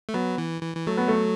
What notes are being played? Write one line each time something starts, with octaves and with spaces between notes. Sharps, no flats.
A3
F#3 B3
E3
E3
E3
F#3 A3
B3
A3